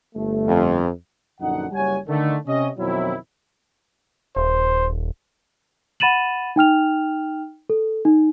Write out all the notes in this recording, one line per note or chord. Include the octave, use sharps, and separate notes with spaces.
G1 A3
F2
A#1 F#2 D3 D#4 D#5 F#5
F#1 G3 C#5 F#5 G#5
D3 D#3 A3
C3 C#4 D#5
F2 B2 D#3 F#3 C4 E4
D#1 C5
F#5 B5 A6 D#7 E7 F#7
D#4 G5 F6 F7
A4
D#4